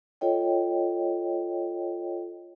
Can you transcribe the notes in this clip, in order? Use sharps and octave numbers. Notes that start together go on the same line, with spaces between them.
F4 A4 C#5 D#5 G5